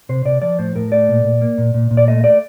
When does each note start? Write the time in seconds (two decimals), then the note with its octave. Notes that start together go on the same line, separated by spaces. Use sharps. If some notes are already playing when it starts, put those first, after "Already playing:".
0.09 C3 C5
0.25 C3 D5
0.42 F3 D5
0.59 A2 C5
0.76 A2 A#4
0.92 A3 D5
1.09 A#2
1.25 A#2
1.42 A#3
1.58 A#2
1.74 A#2
1.91 A#2
1.97 D5
2.08 A3 D#5
2.24 A3 D5